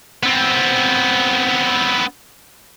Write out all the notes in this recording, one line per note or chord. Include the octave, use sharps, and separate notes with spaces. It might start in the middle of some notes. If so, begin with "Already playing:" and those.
B3 C4